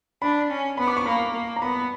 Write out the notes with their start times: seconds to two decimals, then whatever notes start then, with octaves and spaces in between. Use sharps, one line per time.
0.22 D4 B5
0.50 C#4
0.78 B3 B5
0.87 D6
0.97 C#6
1.05 A#3 B5
1.34 A#3
1.56 A#5
1.62 B3 B5